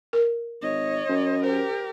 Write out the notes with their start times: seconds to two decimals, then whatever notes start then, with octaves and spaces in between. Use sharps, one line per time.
0.13 A#4
0.62 G#1 C#5 D#5
1.09 F#2
1.43 G4 A#4 C5